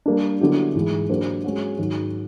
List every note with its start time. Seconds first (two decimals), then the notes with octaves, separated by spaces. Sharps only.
0.06 G3 A#3 D4
0.41 D3 F#3 B3 E4 G4
0.75 G#2 E3 G#3
1.09 F#3 A#3 D4 G4 C5
1.44 G#3 C#4 F#4
1.78 G#2 D#3 F#3